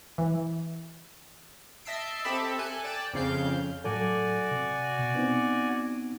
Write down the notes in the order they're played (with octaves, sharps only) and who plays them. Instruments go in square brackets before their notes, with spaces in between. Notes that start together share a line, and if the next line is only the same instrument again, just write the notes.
[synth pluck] E3
[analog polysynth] D#5 E5 A5 E6 C7 D7
C4 G4 A4 E5 A5 B5
A4 G#5 F#6
D5 G5 A5
F2 C#3 F5 G6
[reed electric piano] A2 F#3 A4 [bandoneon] F#4 D5 G#5
[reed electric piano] C3
B2
B3 C4 D#4